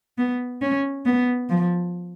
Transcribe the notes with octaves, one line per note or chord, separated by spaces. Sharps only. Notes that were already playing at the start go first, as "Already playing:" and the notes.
B3
C#4
B3
F3